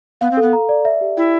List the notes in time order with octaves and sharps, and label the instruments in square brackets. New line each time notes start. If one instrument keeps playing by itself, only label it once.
[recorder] B3 [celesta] F5
[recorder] C4
[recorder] B3 [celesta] A4
[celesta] A#5
D5
E5
G4
[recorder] E4 [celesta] G5